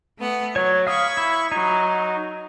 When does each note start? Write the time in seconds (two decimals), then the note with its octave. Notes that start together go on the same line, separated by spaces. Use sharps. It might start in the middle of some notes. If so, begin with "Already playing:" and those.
0.19 A3 B3 F#5
0.56 F#3 C#5
0.87 F5 B5 C#6 D#6 G#6
1.17 E4
1.52 F#3 D#4